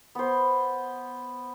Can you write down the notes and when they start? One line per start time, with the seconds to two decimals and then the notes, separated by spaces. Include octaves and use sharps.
0.15 B3 C5